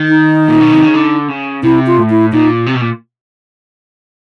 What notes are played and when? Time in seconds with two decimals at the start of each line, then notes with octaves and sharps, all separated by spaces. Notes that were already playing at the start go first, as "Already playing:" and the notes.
Already playing: D#3
0.08 D#4
0.48 A#2
0.60 B2
0.72 C3
0.83 C#3
0.94 D3
1.28 C#3
1.63 C3 E4
1.86 F4
1.97 A2
2.10 E4
2.33 A#2 D#4
2.66 C3
2.75 B2
2.81 A#2